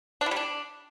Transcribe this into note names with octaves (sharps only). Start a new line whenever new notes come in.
D4
E3
G3
D4